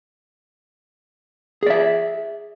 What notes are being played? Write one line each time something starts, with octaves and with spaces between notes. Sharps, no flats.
G#4 D5 E5